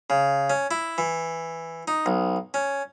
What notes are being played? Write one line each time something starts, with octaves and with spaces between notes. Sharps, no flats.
C#3
C#4
E4
E3
D#4
B1
C#4